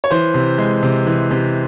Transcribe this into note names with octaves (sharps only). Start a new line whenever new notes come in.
C#5
E3 C5
C3
G#3
C3
E3
C3